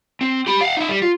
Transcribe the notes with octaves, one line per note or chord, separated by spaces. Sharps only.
C4
G4 B5
F5 F#5
D#4 E5
G3
F4